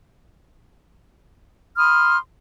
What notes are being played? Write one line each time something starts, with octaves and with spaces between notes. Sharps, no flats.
B5 C6 D#6 F6